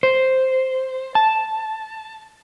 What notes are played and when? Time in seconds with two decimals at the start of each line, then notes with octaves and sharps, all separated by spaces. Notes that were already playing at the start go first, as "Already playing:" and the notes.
0.03 C5
1.15 A5